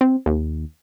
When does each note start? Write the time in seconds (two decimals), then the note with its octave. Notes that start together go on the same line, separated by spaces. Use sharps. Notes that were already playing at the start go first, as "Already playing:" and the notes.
0.01 C4
0.26 D#2